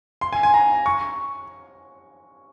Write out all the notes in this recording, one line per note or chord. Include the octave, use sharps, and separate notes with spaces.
C6
G#5
G#5
A#5
C#6